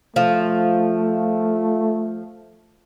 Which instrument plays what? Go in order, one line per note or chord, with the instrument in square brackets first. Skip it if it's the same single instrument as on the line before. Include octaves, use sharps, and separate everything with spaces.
[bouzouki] F3 [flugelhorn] A3